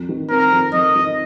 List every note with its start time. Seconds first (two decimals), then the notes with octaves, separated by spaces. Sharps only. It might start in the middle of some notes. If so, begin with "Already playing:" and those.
Already playing: F2
0.09 D#3
0.30 C4 A#4
0.52 F2
0.73 F2 D#5
0.95 D#3